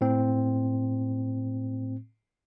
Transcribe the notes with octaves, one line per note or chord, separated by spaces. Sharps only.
A2 C4